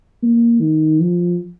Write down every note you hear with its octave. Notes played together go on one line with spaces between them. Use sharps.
A#3
D#3
F3